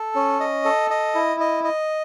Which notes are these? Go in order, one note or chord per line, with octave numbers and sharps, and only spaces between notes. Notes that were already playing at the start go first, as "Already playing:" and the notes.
Already playing: A4
C#4
D#5
A4
D#5
E4
D#5
D#5